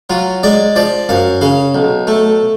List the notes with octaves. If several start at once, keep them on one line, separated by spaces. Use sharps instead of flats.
F#3 F4
G#3 D5
F3 D5
F#2 F5
C#3 F5
B1
A3